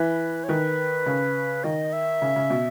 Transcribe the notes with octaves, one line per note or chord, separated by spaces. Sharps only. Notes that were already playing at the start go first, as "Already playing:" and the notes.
Already playing: E3 B4
C#5
D#3 B4
C#3
D#3 D#5
E5
C#3
C#3
B2